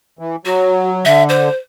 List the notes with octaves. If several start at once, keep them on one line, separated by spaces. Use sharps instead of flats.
E3
F#3 F#4
D3 E5
C5